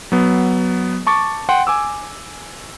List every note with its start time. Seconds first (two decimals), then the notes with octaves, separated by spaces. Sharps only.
0.12 F#3 B3
1.07 A5 C#6 D6 A6
1.49 F#5 G5 C6
1.67 G#5 D6 E6